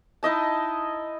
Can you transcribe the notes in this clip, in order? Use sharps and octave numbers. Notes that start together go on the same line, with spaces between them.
D#4 E4 D#5 A5